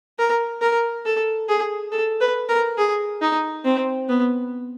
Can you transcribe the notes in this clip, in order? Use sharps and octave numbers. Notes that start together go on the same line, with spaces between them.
A#4
A#4
A4
G#4
A4
B4
A#4
G#4
D#4
C4
B3